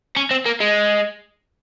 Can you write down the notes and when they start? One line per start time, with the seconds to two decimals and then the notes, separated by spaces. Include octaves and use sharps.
0.17 C#4
0.31 C4
0.46 A#3
0.61 G#3